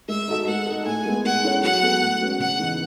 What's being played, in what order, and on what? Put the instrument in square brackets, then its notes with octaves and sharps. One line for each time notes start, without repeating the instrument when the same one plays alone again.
[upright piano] G#3 [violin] E5
[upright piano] D#4 F#4 A4 D#5
[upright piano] G#3 [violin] F#5
[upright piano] D#4 A4
[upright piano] A2 [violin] G#5
[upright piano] G#3 B3
[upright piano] G#3 [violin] F#5
[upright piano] C#4 E4 A4 C#5
[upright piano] F#3 [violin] F#5
[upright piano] B3 F#4 A4
A2
G#3 C#4 F#4 B4
[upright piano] C#3 [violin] F#5
[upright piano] E3 B3 D#4